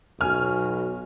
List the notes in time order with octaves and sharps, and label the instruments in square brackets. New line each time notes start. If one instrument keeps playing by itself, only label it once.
[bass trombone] B1 [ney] F#4 [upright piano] G#5 [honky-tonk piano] F6